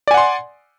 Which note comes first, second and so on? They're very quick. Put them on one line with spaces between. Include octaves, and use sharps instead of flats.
D5 G#5 F#5 C6